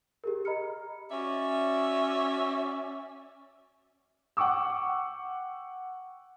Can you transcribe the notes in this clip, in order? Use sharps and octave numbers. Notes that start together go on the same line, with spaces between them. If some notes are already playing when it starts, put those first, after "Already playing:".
G4 G#4 A#4
D#5 A#5 B5 F6 C#7
C#4 F#4 D5 E5
F#5 G5 C#6 D6 E6